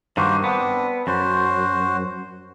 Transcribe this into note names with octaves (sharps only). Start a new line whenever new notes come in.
G2 D#3 A#3 F#4 C5
B3 C4 D4
F#2 F#4 C5